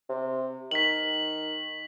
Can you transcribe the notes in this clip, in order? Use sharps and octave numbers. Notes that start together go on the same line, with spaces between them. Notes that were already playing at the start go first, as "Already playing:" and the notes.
C3
D#3 B6 F#7